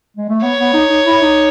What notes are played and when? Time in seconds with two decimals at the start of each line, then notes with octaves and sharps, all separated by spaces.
0.17 G#3
0.29 A3
0.43 B3 C#5
0.59 B3
0.74 D#4
0.90 D#4
1.05 E4
1.22 D#4